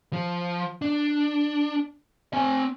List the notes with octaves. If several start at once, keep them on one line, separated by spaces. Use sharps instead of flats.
F3
D4
C4 G#5